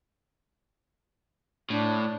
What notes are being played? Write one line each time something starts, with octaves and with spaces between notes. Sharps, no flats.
A2 D4